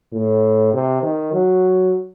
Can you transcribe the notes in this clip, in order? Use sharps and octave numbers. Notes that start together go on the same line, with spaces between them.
A2
C3
D#3
F#3